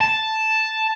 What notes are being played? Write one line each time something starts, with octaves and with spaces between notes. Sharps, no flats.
A5